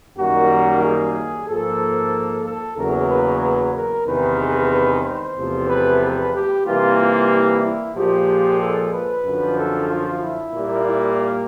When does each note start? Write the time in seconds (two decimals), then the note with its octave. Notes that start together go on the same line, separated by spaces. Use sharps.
0.18 F#2 D#3 G3 A#3 F#4
0.83 G#4
1.49 G#2 F3 A#3 A4
2.46 A4
2.77 E2 C#3 F#3 A#3 A#4
3.10 B4
3.42 B4
3.75 A#4
4.07 E2 C3 D#3 G#3 B4
4.72 B4
5.05 C5
5.37 E2 C3 F3 A3
5.69 B4
6.02 B4
6.34 G4
6.66 C3 E3 G3 A#3 F4
6.98 F4
7.31 E4
7.63 E4
7.95 A#2 F3 G#3 G4
8.60 A4
8.93 B4
9.25 F#2 D3 F3
9.57 A4
9.89 F4
10.22 E4
10.54 A#2 G3 A#3
10.87 E4